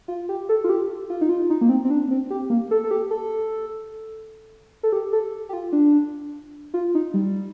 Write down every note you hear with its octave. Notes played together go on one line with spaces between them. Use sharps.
F4
G4
A4
F4
G4
F4
D#4
F4
D#4
A#3
C4
C4
D4
C4
G4
A#3
A4
A4
G4
A4
A4
G4
A4
G4
F4
D4
F4
D#4
G3